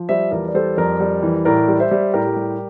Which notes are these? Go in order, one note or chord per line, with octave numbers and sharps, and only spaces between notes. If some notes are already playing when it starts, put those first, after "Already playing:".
Already playing: F3
G3 C5 E5
E2 A#4 D5
D5
G3 A4 C5
F2 A#4 D5
G3
E3
A2 A#4 D5
G3
C5 E5
G3
A2 G4 A#4
G3